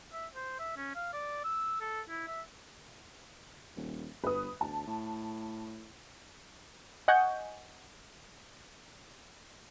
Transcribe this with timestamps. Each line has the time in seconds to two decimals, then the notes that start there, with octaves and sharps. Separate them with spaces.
0.12 E5
0.35 C5
0.60 E5
0.77 C#4
0.95 F5
1.13 D5
1.44 E6
1.81 A4
2.09 E4
2.27 E5
3.77 D#1
4.24 G1 B4 D#6
4.61 D2 A5
4.87 A2
7.08 D#5 F#5 G#5 C#6 G6